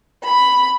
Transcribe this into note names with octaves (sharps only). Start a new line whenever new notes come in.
B5